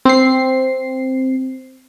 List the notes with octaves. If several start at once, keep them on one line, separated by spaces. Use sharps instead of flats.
C4 C7